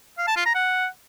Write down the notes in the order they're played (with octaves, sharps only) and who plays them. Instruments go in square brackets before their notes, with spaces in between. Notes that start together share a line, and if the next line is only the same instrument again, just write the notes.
[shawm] F5
A5
F4
A#5
F#5